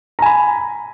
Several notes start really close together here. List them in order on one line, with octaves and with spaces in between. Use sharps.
A#5 G#5 B5